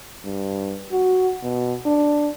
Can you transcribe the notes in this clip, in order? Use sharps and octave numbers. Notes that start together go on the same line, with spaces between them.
G2
F#4
B2
D4